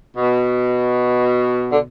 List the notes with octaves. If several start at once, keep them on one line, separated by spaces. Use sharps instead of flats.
B2
D3